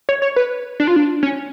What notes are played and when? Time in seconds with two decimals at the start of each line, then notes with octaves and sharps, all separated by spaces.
0.09 C#5
0.22 C#5
0.36 B4
0.80 D4
0.87 F4
0.96 D4
1.23 C#4